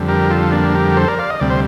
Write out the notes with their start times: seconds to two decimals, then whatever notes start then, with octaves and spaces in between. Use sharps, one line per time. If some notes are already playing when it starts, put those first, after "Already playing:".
Already playing: F2 D3 G3
0.08 G4 A#4
0.30 F4 A4
0.52 A#3 D4
0.75 G4 A#4
0.97 A4 C5
1.08 A#4 D5
1.19 D5 F5
1.30 D#5
1.40 D2 C3 G3 D5
1.50 C5